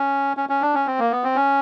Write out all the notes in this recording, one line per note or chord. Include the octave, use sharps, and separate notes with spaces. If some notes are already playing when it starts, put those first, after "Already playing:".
Already playing: C#4
C#4
C#4
D4
C#4
C4
A#3
B3
C4
C#4